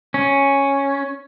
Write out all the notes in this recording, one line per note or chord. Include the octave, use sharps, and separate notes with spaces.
C#4